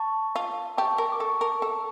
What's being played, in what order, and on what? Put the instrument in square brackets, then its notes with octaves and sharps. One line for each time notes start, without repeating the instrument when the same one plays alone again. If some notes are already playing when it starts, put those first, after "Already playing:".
Already playing: [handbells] A5 C#6
[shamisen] F4
[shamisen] G4 [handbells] A5 C#6
[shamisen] A#4
[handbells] D6
[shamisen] A4 [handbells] A5 C#6
[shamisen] A#4
A4